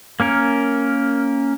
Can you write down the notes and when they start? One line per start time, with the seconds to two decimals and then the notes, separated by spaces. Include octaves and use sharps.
0.20 A#3 C#4 A#4